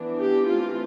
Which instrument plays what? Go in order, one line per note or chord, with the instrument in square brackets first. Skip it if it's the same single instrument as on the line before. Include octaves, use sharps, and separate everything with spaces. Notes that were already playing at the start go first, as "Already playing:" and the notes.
Already playing: [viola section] E3 B3 D4
G4
E3 A3 C4 F4